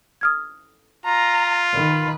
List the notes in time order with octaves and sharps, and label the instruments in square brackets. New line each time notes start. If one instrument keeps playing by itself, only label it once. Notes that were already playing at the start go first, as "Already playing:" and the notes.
[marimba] D#6 F6 G#6
[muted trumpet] F4 [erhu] A#5
[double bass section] D#3 [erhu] B4